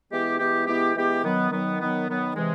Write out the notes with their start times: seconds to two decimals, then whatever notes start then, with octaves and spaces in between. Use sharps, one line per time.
0.11 E3 G#3 B3 E4 G4
0.39 E3 G#3 B3 E4 G4
0.67 E3 G#3 B3 E4 G4
0.95 E3 G#3 B3 E4 G4
1.23 D#3 F#3 B3
1.51 D#3 F#3 B3
1.80 D#3 F#3 B3
2.07 D#3 F#3 B3
2.36 C3 E3 G#3